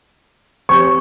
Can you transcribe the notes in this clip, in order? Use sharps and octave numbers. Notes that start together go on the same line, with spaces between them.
F3 C4 G4 C#5 C#6